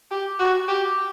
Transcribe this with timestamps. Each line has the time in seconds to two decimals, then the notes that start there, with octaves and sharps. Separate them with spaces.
0.11 G4
0.39 F#4
0.68 G4